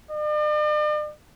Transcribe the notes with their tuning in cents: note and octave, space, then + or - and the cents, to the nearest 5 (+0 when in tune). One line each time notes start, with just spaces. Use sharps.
D5 +45